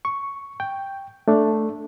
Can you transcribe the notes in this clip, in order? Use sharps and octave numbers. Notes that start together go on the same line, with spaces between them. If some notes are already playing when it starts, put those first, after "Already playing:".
C#6
G5
A3 D4